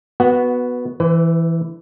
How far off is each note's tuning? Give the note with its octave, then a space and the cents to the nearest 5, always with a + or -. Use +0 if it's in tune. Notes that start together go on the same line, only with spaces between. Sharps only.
B3 +0 F#4 +0 F#5 -20
E3 +0 B4 +45